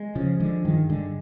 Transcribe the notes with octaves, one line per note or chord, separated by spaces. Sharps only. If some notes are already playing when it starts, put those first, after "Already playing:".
Already playing: G#3
C#3 F3
D3 G#3
G2 D#3
D3 G#3